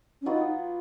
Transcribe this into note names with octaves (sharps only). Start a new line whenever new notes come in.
C#4
F#3 B3 D#4 F4